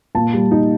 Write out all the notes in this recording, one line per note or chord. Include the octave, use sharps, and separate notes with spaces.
A#2 A5
G3
D#4